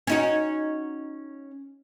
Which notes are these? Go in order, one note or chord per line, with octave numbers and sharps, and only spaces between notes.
C#4 D#4 F#4